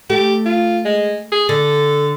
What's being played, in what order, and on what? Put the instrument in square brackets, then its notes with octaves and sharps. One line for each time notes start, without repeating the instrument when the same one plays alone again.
[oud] A3 [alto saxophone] G4
[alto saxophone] F4
G#3
G#4
[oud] D3 [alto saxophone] A4